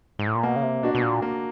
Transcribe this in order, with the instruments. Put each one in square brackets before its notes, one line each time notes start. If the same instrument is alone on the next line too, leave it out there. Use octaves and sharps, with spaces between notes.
[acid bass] G#2
A2
A#2
[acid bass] B2 [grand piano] A#3
[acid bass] C#3
C3
[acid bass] B2 [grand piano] D4 F#4
[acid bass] B2
A#2
[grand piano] A#3